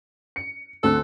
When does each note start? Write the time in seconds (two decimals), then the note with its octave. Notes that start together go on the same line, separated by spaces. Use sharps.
0.36 C#7
0.83 D2 C4 A4 F#6